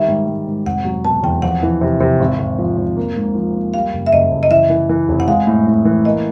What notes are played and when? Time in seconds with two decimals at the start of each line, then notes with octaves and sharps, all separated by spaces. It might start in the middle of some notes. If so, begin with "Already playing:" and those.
Already playing: D#3 G3 E5
0.08 G#2
0.28 G#2
0.47 G#2
0.65 F1 F#5
0.85 F#3
1.05 B2 A5
1.23 E2 G5
1.42 F2 F#5
1.63 E3
1.81 C3
2.00 C3
2.20 G#1
2.39 G#1
2.58 F3
2.78 G#1
2.96 A#3
3.16 G#2
3.35 F3
3.55 A#3
3.74 G3 F5
3.93 F#1
4.06 E5
4.12 F#1 D#5
4.31 F#1
4.43 D#5
4.51 E3 E5
4.70 E3
4.89 E3
5.08 F1
5.20 F#5
5.28 G#3 F5
5.47 A2
5.67 A2
5.85 E3
6.05 A#3 D#5